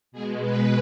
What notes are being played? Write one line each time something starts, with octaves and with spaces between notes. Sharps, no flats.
B2 G#3 G#4
B4